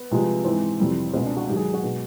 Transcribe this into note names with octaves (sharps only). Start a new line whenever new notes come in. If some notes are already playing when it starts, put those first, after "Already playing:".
Already playing: B3
C2 C3 F3 G#3
G#2 E3 G#3 C4
F2 C3 E3 G3
C#2 B2 G#3 C4
D4
F#4
G#2 D#3 F#3 G4
G#4
F#4
B2 G#3